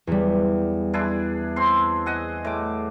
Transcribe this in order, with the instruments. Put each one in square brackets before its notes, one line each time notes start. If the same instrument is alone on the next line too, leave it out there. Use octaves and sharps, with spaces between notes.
[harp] E2 G3
[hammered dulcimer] D4 E4 G#4
C4 C6
D#5 F#5 G#5
A2 D6